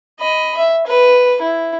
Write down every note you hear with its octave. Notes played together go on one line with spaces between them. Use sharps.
D#5 B5
E5
B4
E4